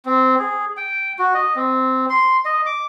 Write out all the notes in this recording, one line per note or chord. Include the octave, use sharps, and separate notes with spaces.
C4
G#4
G5
F#4
D#5
C4
C6
D#5
D6